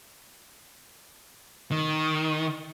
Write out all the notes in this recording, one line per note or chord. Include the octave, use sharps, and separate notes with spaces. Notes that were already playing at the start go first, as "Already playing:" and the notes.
D#3